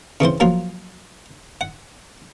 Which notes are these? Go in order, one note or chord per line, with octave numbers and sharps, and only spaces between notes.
C#3 E3 C4 C5
F3 F#3 A#3 F4
F#5